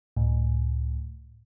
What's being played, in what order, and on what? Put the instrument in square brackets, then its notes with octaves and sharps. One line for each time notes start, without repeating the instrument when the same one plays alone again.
[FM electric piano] C#2 A2